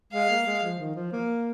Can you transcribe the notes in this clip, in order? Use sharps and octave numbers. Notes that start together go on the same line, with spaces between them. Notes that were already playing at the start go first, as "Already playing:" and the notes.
G#3 F5
A#3
G#3
F3
D#3
F3
A#3